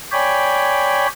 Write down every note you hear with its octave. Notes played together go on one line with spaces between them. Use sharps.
C#5 D5 G5 G#5 B5